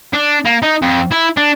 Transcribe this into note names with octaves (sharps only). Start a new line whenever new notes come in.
D4
A#3
D#4
F2
E4
D4